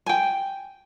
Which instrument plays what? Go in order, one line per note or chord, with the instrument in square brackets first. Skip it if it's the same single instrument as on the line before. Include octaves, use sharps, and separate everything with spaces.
[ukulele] G5 G#5